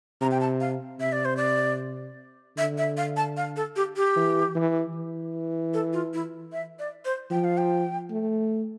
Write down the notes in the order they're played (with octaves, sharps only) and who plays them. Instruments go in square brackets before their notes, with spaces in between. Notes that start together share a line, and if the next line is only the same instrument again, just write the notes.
[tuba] C3 [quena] A#5
[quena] G5
A5
F5
[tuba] C3 [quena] E5
[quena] D5
C5
D5
[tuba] D3 [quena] E5
[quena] E5
F5
A5
F5
A4
G4
G4
[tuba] E3
E3
E3
[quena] A4
F4
E4
E5
D5
C5
[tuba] F3 [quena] G5
[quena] F5
G5
[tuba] A3